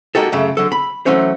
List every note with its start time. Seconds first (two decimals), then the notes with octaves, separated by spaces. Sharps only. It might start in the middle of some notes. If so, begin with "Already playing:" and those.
0.15 G#3 A#3 D#4 F#4 G4 A4
0.32 F#2 C#3 A3
0.57 D3 F#3 A4
0.72 B5
1.06 E3 F#3 A3 C#4 C5